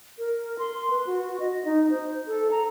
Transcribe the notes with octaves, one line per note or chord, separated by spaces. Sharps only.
A#4
C6
B4
F#4
D#5
D#4
C5
A4
A#5